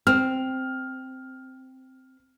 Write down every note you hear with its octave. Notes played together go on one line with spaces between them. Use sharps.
C4 F6